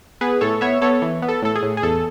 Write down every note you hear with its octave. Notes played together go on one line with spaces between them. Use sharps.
B3 G#4 B4
A2 A4 C#5
B3 C#5 E5
B3 A4 C#5
E3
B3
A4
A2 A4
G#4
A2
G#4
E2 A4